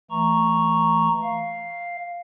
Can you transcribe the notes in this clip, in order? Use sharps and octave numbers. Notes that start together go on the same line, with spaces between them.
E3 A3 A#5 C#6
F5